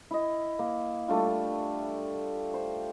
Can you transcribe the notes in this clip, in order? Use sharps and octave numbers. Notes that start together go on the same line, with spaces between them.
E4 D#5
A#3
G3 A3 D4 F4
C5